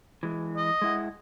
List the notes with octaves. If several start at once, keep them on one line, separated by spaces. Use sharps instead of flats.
E3 G#3
D#5
G#3 E4 F#5